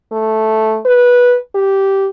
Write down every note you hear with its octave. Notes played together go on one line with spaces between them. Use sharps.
A3
B4
G4